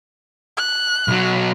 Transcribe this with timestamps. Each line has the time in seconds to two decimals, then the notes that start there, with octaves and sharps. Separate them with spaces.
0.57 F#6
1.08 B1 F#3